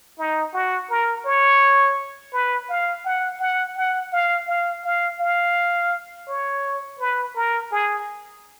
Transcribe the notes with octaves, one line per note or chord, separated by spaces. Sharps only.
D#4
F#4
A#4
C#5
B4
F5
F#5
F#5
F#5
F5
F5
F5
F5
C#5
B4
A#4
G#4